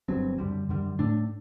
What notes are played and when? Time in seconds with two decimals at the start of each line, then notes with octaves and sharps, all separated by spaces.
0.08 G1 G2 F#3 C4
0.38 F#2 D3 G3
0.69 F#2 D3 G3
0.99 A2 A3 D4